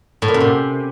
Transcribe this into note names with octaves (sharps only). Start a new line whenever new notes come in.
A2
A#2
F#2
C3